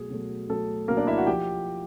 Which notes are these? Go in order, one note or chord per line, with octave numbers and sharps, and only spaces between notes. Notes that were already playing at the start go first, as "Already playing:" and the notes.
Already playing: B2 F#3 A3 G#4
B2 F#3 A3
B2 F#3 A3 A4
B2 F#3 A3 A#3 A#4
D4 D5
E4 E5
F#4 F#5
F3 G4 G5